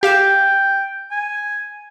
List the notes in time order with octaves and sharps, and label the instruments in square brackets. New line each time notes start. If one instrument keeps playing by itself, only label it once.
[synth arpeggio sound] G4 F5 E7 [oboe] G5
[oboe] G#5